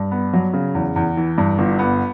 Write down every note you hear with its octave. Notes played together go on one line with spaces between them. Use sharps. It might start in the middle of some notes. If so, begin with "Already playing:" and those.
Already playing: G2
B3
F#3
C#3
E2
E2
E3
G2
G1
B3